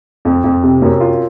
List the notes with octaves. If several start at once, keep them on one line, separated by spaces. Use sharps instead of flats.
F2
F2
C3
F#2
F4